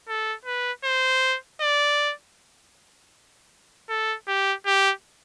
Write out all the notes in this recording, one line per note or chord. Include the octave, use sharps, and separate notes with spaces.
A4
B4
C5
D5
A4
G4
G4